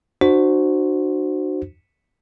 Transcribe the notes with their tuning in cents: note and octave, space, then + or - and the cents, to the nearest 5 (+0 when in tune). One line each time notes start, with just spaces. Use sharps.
D4 +35 F#4 +0 C5 +0